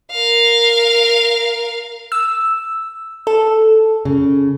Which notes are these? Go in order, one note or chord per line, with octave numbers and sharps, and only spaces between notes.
A#4 F5
E6
A4
C#3